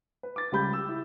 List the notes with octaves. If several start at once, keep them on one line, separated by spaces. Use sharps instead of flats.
B4
D6 A6
C#2 G3 B5 G6
E6
E4